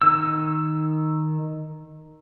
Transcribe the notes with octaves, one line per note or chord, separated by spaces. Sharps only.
D#3 E6